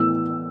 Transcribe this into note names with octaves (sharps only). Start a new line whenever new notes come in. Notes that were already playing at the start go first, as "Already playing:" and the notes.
Already playing: A2 E3 B3 E6